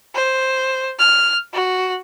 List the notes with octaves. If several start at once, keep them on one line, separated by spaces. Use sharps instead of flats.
C5
F6
F#4